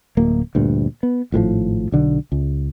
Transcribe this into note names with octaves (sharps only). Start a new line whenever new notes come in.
D1 A#3
D2 G2 A#2
B3
G#1 A2 E3 F3
B1 D3
C#2